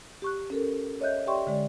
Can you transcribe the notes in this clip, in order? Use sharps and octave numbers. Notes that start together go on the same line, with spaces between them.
G4 C#6 F#6
C#4 A4 A#4
C#5 D#5 E5 F#6 G6
G4 D5 E5 G5 C6 C#6
D3 G#3 D5